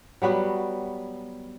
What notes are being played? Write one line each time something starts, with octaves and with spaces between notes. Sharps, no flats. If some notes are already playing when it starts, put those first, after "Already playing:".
F#3 G3 B3 F#4